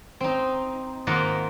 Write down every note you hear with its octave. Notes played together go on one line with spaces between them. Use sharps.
C4 D#4
G#2 D#3 A#3 F4 D#5 F#5